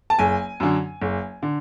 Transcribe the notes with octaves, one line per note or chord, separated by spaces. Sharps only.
A5
F#1 G#5
F#2 D3
F#1
D3